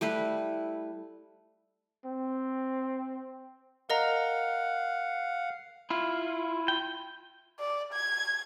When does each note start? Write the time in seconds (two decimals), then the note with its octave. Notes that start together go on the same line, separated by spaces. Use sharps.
0.01 G3 A3 E4 B4
2.06 C4
3.90 A#4 D#5 F5 F#5 A#5
5.90 E4 F4
6.68 G5
7.59 D5
7.93 G#6